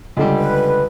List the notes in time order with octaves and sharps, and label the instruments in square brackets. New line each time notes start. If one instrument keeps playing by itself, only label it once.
[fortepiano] C#2 D3 G3
[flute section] B4